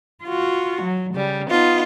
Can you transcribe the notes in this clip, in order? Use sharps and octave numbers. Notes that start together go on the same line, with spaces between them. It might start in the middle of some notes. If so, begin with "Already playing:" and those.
F4 F#4
F#3
C#3 G3
B3 D#4 F4